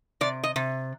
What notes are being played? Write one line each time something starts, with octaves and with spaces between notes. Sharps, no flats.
C3 D5
D#5
C3